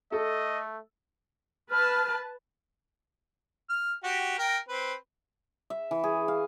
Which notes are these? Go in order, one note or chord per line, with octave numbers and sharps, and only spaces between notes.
A3 A4 D#5
B4 A5 F6
F6
F#4 G4
A#4 G5
C4 B4
E5
E3
G#4
F5